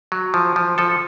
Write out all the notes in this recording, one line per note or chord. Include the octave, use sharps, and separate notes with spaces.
F#3
F3
F3
F3 A4